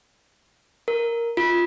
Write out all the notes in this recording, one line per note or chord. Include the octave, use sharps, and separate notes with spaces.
A#4
F4